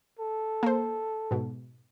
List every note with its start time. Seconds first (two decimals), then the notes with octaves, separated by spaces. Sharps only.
0.19 A4
0.63 A#3 C5
1.31 G#2 B2